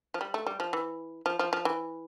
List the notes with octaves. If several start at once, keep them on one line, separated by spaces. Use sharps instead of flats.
F3
G3
A3
G3
F3
E3
F3
F3
F3
E3